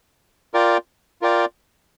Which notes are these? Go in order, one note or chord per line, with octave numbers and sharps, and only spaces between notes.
F4 A#4 D5 G5
F4 A#4 D5 G5